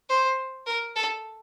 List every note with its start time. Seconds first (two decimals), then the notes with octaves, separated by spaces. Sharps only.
0.09 C5
0.67 A#4
0.96 A4